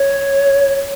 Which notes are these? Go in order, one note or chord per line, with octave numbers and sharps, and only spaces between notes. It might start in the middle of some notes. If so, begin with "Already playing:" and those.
Already playing: C#5